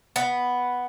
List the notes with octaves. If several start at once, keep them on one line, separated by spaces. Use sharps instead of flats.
B3